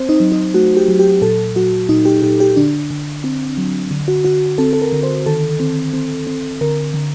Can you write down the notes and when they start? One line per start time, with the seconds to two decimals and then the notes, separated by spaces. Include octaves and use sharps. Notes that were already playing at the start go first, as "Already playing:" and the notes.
Already playing: C4 C5
0.09 D#4
0.20 F#3
0.32 D#4
0.54 A3 F#4
0.77 G4
0.88 F#3
0.99 G4
1.22 A#2 A4
1.56 F#3 F#4
1.89 A#2 D#4
2.05 G4
2.23 A#2 G4
2.40 G4
2.57 D3 D4
2.91 D3
3.24 C4
3.57 F#3
3.91 D3
4.08 F#4
4.25 D3 F#4
4.58 C4 A4
4.73 A4
4.82 A#4
4.92 D3
5.03 C5
5.26 D#3 A4
5.60 C4
5.93 C4
6.27 C4
6.61 D3 A#4
6.94 D3